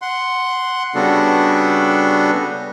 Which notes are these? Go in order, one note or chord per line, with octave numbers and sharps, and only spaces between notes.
F#5 C6
C#3 G3 B3 D4 F#4 A4